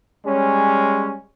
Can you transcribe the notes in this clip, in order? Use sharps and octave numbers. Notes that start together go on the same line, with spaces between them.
G3 G#3 C#4